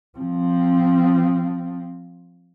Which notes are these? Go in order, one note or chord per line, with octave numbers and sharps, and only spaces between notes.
F3 C4